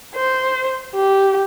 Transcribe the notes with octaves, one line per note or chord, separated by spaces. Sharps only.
C5
G4